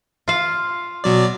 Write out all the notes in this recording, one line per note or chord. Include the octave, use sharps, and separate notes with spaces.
F4 F5
B2 F#3 D5